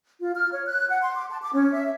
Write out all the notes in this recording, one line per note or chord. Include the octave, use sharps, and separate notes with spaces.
F4
F6
C#5
F#6
F#5
C6
D6
A5
D6
C#4
E5